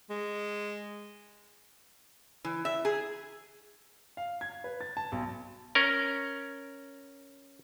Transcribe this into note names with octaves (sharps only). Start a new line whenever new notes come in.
G#3
E3
E5
G#4
F5
G#6
B4
A6
A5
B1
C#4 A#4